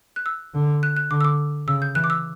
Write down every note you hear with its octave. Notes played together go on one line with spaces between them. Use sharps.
F#6
E6
D3
F#6
F#6
D3 D6
E6
D6
C#3 E6
G6
E3 F#6
D6
E6